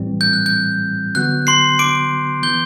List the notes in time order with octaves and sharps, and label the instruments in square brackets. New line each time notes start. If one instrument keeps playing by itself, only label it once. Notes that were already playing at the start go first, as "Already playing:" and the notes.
Already playing: [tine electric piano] A2 E3 G3 C4
[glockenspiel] G6
F#6
G6
[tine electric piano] D3 F#3 B3 F#4 [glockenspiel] F#6
[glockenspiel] C6 C7
D6 D7
[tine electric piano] E3 B3 [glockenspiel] G6 G7